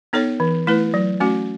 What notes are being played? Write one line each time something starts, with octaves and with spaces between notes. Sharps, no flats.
B3 D#4 A4 C#5
E3
A3 E4 B4
F#3
A3 C#4 F#4